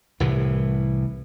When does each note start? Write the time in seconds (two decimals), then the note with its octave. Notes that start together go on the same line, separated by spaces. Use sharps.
0.20 C2 A2 E3